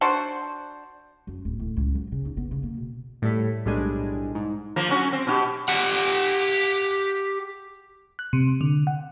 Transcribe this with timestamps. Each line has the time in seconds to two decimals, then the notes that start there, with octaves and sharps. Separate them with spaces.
0.01 D4 F#4 C5
1.27 F#2
1.45 D1
1.60 A2
1.77 C#2
1.95 F#3
2.12 C#3
2.25 D#4
2.37 B3
2.51 C#3
2.63 A#3
2.77 B2
3.22 A2 G3 A4 B6
3.66 B1 A2 G3 G#3 D4 G#5
4.35 G#2
4.76 F3 A#3
4.89 F#3 C#4 F#4
5.13 C4
5.27 B2 F4 G4
5.68 G4 F#5
8.19 F#6
8.33 C3
8.61 D3
8.87 F#5